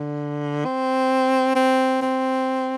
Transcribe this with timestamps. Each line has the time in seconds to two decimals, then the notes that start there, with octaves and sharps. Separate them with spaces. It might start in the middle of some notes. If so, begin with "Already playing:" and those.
Already playing: D3
0.65 C4
1.55 C4
2.02 C4